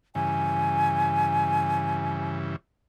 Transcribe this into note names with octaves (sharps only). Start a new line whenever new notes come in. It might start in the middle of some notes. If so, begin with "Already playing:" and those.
G2 C#3 E3 G#5